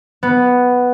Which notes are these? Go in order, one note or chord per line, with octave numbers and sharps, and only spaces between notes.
B3